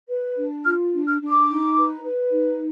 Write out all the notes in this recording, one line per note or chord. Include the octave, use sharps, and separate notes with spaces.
B4
D4
F4 F6
D4
F6
D4
D6
D#4
B4
B4
D#4